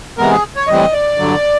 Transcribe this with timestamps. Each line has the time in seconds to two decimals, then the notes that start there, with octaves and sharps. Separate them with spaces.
0.18 C3 E3 G#3 B3 A#4
0.31 G#4
0.56 C#5
0.68 A2 E3 G3 C4 D#5
0.93 D5
1.18 G2 D3 F#3